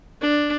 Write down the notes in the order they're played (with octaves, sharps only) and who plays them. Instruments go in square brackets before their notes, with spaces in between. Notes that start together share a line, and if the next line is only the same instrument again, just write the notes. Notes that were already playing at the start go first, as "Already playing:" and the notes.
[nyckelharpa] D4